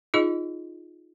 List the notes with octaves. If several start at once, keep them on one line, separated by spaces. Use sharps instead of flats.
D#4 F4 G#4 D#5